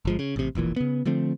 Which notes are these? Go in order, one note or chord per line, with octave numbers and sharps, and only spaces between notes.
G1 F3 G#3
C#3
A1 C3
E1 A#1 A#2 E3
C#3 B3
D3 F3 A3 C4